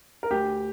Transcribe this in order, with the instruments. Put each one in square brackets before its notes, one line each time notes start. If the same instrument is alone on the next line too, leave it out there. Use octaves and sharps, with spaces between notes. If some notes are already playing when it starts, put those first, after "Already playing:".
[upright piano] A#4
D2 G4